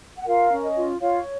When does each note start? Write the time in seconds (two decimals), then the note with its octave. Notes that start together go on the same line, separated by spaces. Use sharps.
0.16 F#5
0.26 F4 A#4 F5
0.51 C#4
0.63 D#5
0.76 F4
1.01 F4 C#5 F5